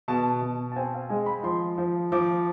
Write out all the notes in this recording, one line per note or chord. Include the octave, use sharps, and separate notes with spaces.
B2 A5
B2
A5
C4 G#5
F5
G#3 G#5
B5
F3 C6
F3
F3 D6